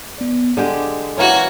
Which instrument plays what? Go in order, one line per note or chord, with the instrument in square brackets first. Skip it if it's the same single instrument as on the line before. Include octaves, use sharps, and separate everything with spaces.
[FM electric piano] B3 D5
[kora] D3 G#3 G4 [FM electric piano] D#5
[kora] E3 A#3 C#4 [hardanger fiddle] F#4 C#5